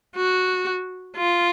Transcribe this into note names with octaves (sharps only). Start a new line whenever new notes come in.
F#4
F4